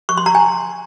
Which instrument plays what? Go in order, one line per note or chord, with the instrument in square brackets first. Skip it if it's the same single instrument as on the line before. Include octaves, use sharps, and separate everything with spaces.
[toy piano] C#6
C6
A#5
G#5